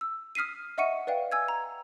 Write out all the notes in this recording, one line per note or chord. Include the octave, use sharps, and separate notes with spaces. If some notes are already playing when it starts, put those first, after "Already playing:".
E6
D#6 F6 B6 C7 D#7
D#5 E5 F#5 C#6 C#7 D#7
B4 D5 F5 G5
G#5 E6 G#6
A#5